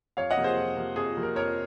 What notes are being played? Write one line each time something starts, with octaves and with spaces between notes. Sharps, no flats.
F2 C#5 F5
D#5 F#5
C3 F3 A#3
G#4 C5
F2
C3 F3 A#3
F2 G#4
C3 F3 A#3
A#4
F2 A#4 C#5